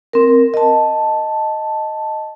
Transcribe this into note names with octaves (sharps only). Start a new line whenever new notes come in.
C4 A#4
D#5 A5